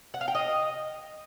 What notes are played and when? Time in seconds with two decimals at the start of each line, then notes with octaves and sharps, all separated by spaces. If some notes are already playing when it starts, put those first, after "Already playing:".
0.14 F#5
0.21 F5
0.28 G5
0.35 D#5